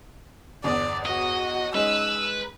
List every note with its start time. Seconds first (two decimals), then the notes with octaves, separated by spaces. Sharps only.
0.64 G1 E2 D5 D#6
1.06 F#4 D#5
1.75 G#3 C#4 D#4 B4 E6